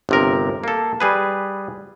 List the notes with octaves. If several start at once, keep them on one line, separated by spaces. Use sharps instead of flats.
G1 C3 A#4
A#3 A4
G3 G#4 B4